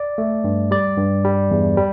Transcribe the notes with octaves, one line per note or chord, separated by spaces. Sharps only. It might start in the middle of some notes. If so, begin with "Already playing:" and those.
Already playing: D5
A3
G2
G3 D5
G2
G3
E2
G3